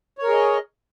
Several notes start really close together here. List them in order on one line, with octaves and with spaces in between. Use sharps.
C#5 A#4 G#4 D#5